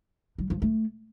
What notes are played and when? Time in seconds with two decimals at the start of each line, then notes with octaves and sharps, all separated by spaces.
0.38 F#3
0.50 F3
0.62 A3